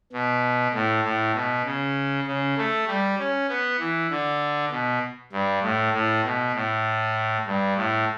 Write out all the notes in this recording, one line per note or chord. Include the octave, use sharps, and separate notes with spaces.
B2
A2
A2
B2
C#3
C#3
A3
G3
C#4
B3
E3
D3
B2
G2
A2
A2
B2
A2
G2
A2